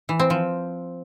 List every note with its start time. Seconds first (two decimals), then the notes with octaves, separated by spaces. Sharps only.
0.09 E3
0.20 C4
0.30 F3